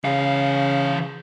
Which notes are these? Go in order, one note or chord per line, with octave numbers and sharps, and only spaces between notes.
C#3 E3 F5